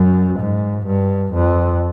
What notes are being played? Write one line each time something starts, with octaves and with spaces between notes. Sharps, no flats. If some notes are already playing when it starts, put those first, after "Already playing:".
Already playing: F#2
G#2
G2
F2